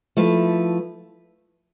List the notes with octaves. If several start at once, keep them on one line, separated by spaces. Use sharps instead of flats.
F3 A3 E4 B4